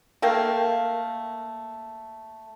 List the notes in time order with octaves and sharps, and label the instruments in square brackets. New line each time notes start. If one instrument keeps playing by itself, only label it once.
[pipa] A3 A#3 F5 G5